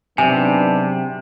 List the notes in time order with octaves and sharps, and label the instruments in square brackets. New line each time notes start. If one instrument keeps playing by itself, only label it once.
[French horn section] G#2 B3 D4 [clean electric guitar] C3 [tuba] F#3 [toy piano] G#5